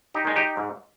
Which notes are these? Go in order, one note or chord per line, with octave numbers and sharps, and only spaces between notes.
D#4 G4
D#3 G#3
D#4 G4
G#2